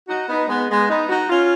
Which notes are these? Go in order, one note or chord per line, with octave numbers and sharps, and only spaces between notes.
D#4 F#4
B3 D#4
G#3 B3
G#3 B3
B3 D#4
D#4 F#4
C#4 F4